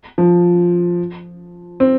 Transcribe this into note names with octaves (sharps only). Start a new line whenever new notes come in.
F3
C4